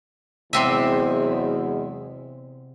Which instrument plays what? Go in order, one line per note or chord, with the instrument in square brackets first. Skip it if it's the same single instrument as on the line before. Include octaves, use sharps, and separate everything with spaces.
[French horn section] E2 F#3 G#3 [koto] C3 C4 E5